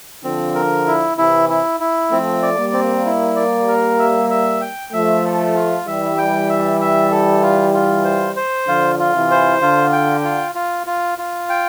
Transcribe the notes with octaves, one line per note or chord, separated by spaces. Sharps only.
D3 F3 C4
A#4
E4
C3 E3 E4
E4
E4
F3 A3 C4
D5
G3 A#3
C4
E4
D5
A#4
E5
E5
G5
F3 A3 E5
A4
F4
E3 G3 E5
G5
E5
E5
A4
F4
F4
C5
C5
D3 F3 F4
F4
C3 E3
C5
D3 F4
G5
F4
F4
F4
F4
G5